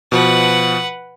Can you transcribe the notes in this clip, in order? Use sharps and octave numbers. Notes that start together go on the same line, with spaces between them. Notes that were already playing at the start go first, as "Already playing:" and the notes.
B2 F3 B4 F#5